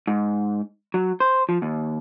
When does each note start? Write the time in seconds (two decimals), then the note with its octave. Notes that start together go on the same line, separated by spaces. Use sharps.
0.08 G#2
0.94 F#3
1.20 C5
1.49 F3
1.62 D#2